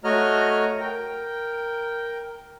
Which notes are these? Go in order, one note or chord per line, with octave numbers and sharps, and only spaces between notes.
A3 F#4 C#5 D#5 A#5 F6
A#4 G5